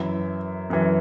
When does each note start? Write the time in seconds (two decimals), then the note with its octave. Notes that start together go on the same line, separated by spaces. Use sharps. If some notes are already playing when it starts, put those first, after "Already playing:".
Already playing: F#2 E3 E4
0.70 F#2 E3